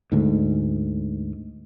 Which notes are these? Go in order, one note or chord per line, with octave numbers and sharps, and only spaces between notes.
D2 G#2